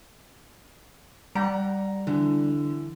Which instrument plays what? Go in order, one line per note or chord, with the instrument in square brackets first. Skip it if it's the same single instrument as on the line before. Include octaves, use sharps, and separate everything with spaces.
[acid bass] G3 [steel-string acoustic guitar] F#5 [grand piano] A#5
[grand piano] D3 [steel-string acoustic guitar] E3